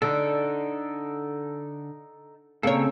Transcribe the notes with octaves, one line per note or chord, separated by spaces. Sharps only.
D3 D#4 A4
C#3 A#3 C4 A4 C#5